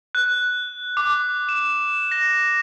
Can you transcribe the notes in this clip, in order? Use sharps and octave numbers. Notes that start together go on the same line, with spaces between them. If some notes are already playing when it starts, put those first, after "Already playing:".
F#6
D6
E7
A#6